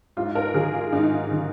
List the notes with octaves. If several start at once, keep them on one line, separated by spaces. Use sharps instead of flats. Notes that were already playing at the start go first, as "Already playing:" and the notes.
G#2 F4
A#4
D#3 G#4
F4
G#2 D#4
D#3